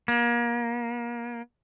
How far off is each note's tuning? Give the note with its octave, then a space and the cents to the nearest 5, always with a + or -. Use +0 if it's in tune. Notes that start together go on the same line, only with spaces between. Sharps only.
A#3 +30